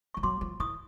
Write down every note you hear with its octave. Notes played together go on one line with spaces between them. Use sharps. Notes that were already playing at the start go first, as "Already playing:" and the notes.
F3 C#6
F#3 C6 D6
F3
E3 C#6 D#6